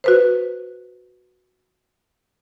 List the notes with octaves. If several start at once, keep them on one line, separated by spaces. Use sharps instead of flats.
F#4 B4 C5